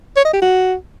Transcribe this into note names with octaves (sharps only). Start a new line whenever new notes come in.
C#5
D#5
G4
F#4